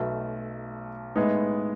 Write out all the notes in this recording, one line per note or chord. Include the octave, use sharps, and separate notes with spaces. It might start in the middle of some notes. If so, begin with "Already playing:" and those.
Already playing: B1 B2 A3
A2 G#3 B3 D#4